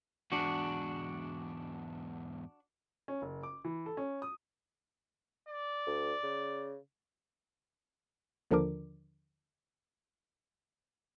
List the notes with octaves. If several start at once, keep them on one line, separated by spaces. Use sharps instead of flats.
E2 G#2 D4 F#4
C#4
F#1
D6
E3
A4
C#4
D#6
D5
D2
C#3
D#2 D3 F3 D4 A#4 D6